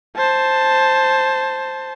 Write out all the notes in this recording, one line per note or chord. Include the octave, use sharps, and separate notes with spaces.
C5 A5